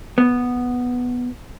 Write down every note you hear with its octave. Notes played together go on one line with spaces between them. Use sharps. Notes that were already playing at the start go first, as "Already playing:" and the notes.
B3